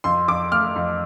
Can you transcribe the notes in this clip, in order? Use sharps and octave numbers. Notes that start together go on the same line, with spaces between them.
F2 C6
F2 D6
A3 F6
F2